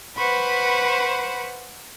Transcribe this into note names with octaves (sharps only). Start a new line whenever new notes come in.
B4 C5 F#5 B5 C#6